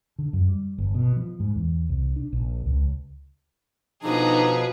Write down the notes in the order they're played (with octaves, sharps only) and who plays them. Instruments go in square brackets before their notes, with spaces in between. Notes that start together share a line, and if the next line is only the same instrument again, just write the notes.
[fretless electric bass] D3
F#2
G3
G1
B2
F3
G#2
E2
C2
D4
A#1
C#2
[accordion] B2 F3 [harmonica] D3 D#5 A#5 [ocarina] D#4 [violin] G#4 B4